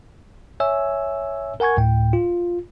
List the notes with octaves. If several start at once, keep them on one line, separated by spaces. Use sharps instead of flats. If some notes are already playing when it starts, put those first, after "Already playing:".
C#5 E5 G#5 E6
A#4 F#5 G#5 C#6 G#6
D2 A2 G5
F4